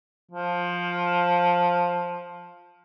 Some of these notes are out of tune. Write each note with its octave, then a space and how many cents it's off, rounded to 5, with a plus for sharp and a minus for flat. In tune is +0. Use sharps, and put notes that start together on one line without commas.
F3 +10